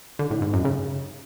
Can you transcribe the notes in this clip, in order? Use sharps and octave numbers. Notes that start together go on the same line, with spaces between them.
D3
A2
G#2
F#2
C#3